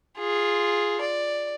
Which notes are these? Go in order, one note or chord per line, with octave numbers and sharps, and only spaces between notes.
F4 G#4
D5